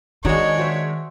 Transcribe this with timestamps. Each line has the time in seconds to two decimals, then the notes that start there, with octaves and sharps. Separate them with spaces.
0.25 D#3 G#3 D4 D#4 F#4 G#4 C#5
0.58 F#4 C5 E5